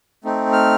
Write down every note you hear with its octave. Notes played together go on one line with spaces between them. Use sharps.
A3 C4 D#4
F6